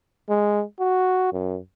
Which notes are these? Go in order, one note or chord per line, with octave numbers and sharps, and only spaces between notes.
G#3
F#4
F#2